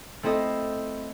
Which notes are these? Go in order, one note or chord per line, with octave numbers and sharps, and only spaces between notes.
A3 C4 E4 A4 D#5